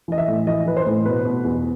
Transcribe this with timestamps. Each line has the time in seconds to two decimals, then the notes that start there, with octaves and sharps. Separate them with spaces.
0.08 E3 D#5
0.18 E5
0.28 A2
0.47 E3 D#5
0.66 E3 B4
0.77 C5
0.86 A2
1.05 B2 B4
1.26 B2
1.44 E2